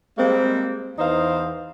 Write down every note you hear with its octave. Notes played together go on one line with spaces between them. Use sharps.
G3 G#3 A#3 C4
E2 E3 D#4 C5 F5